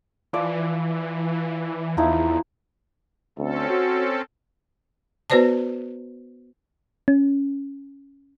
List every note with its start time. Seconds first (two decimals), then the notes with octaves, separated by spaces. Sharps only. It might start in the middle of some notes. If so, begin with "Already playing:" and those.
0.33 E3 F3 D5
1.97 E2 F3 D#4 E4
3.39 D2 C4 C#4 A4
3.70 F#4
5.30 B3 F#4 B4 C5 D5 A5
7.08 C#4